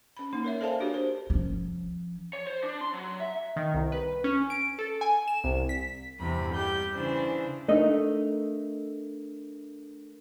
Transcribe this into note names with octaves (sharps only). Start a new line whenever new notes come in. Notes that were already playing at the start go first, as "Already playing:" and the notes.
C#4 B5
A#3 D#4
A#4 C#5 E5
A4 C5 D5 F5 G#5 A5
D4 F#4 G4 A#4 C#5
C5
F3 C#4
C#5
C5
D4
C6
F#3
E5
D#3
C2
B4
C#4
D7
A4
G#5
E7
C2
B6
E2 G2 C3 B5
G3 G4 G6
C#3 E3 D4 C5
A3 D4 D#4 A4 A#4 D#5